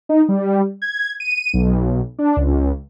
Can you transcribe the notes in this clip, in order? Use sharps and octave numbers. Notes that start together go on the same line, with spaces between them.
D#4
G3
G#6
D#7
B1
D4
C#2